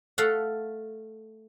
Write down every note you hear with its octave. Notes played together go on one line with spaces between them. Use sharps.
A3 A4 F5 F#5